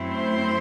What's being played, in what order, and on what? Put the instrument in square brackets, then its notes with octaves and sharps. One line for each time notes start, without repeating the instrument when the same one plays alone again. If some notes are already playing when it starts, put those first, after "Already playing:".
Already playing: [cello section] F#2 F#3 A3 C4 E4
C5